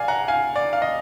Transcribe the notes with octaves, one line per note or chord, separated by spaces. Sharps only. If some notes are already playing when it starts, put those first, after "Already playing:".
Already playing: D5 F5 G#5
F#5 A#5
F5 G#5
D5
F5
D#5